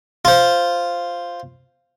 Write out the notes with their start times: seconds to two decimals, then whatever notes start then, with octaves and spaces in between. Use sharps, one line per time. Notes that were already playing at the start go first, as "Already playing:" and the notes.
0.25 F4 C5